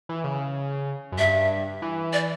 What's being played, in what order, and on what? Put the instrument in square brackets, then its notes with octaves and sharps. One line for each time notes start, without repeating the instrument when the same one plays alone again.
[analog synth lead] E3
C#3
F#2
[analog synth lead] G2 [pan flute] E5
[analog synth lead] E3
[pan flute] D5